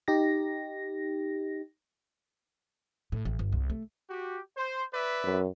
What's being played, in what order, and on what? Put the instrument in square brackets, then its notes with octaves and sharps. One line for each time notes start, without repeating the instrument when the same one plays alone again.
[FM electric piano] D#4 G4 A#6
[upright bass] A2
A1
G1
C2
A3
[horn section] F#4 G4
C5
B4 D5 E5
[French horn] F#2